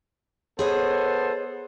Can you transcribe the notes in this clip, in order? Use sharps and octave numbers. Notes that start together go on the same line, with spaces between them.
B3 G#4 A4 C5 C#5 D#5